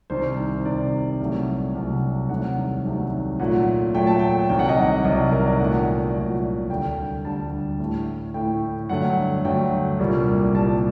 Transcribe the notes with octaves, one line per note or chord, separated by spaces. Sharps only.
C2 C3 D#3 C5
C2 C3 D#3 D5
C2 C3 F#3 A3
C2 C3 F#3 A3
C2 C3 D#3 F#3 A3 F#5
C2 C3 D#3 F#3 A3
A#2 F#3 A3 F#5
A#2 F#3 A3 G5
A5
G5
C2 C3 D#3 F#3 G5
F#5
D#5
F#5
C2 C3 D#3 F#3 D#5
A#4
D5
C2 A#2 F#3 A3 F#5
C2 A#2 F#3 A3
D2 D3 G3 G5
D2 D3 G3 A5
A2 A3
A2 A3 G5
G2 D3 F#3 A3 F#5
G2 D3 F#3 A3 G5
C2 A#2 G3 A#3
C2 A#2 G3 A#3 A5